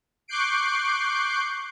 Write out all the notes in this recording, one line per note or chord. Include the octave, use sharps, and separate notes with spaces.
C#6 D6 F#6 G6 C7 D7